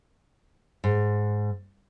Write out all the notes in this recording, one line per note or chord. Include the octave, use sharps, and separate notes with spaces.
G#2